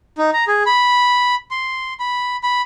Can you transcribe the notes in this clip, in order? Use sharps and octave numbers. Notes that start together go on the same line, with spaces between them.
D#4
A#5
G#4
B5
C6
B5
B5